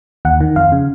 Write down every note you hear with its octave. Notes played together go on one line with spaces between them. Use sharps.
D#2 F#5
D#3
F2 F5
C#3